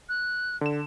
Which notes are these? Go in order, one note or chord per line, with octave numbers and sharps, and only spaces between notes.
F#6
D3 E7